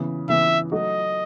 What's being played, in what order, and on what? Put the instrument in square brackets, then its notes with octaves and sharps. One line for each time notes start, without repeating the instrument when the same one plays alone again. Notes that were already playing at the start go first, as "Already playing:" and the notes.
Already playing: [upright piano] C#3 E3 B3
[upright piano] C#3 E3 B3 [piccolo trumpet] E5
[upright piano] F#3 A3 D#4 F#4 [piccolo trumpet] D#5